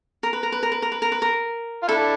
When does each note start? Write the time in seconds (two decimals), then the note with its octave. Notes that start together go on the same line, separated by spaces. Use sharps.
0.23 A#4
0.33 B4
0.43 A#4
0.52 B4
0.63 A#4
0.72 B4
0.82 A#4
0.92 B4
1.02 A#4
1.12 B4
1.22 A#4
1.83 F4
1.88 D4 E4 A4